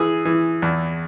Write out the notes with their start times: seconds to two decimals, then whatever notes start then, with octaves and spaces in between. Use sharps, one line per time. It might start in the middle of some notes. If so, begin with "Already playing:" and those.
Already playing: E3 G#4
0.25 E3
0.62 E2